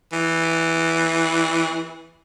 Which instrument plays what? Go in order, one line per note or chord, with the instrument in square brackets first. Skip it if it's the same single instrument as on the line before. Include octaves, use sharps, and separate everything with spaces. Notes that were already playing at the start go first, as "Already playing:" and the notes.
[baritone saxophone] E3